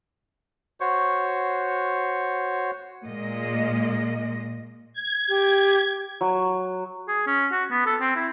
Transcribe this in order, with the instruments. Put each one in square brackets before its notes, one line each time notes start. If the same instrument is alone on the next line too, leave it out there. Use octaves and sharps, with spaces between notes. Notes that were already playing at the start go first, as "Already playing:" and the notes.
[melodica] F#4 C5 C#5 C#6
[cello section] A#2 G#3 D#5
[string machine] G#6
[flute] G4
[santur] F#3
[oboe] G#4
C#4
F#4
B3
A4
C4
E4